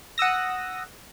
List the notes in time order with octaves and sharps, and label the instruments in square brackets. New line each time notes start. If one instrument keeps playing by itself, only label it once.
[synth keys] F#5 D#6 E6 A#6